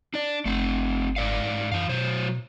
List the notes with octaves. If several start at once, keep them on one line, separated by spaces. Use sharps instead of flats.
D4 D5
G1 A3 C4
G#2 D5 F5
F#2 E3 F5
B2 F#3 C5